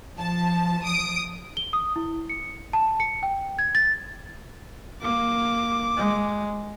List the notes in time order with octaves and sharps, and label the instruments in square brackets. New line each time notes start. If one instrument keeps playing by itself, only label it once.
[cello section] F3 [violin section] A5
[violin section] D#6 D7
[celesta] G7
D#6
E4
C#7
A5
C#7
G5
G#6
A6
[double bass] A#3 [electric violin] D6
[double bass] G#3